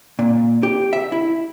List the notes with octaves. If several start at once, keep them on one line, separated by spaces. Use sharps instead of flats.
A#2
G4
E5
E4